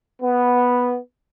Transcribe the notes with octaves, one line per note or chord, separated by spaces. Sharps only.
B3